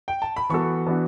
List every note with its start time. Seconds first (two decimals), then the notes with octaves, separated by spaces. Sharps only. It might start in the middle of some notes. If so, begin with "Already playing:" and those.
0.08 G5
0.22 A5
0.36 B5
0.49 E3 B3 F#4 A4 C#6
0.86 E3 B3 D4 F#4